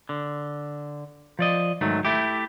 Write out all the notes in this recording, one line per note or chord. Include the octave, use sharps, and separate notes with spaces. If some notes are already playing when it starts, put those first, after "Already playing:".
D3
F3 D5 D#5
G#2 D#3 F#3 A3
A3 E4 G4